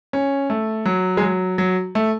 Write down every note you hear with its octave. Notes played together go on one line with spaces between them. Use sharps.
C#4
A3
F#3
G#3
F#3
F#3
A3